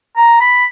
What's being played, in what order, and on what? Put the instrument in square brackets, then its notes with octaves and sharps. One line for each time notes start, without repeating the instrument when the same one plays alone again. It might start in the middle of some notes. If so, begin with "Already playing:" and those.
[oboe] A#5
B5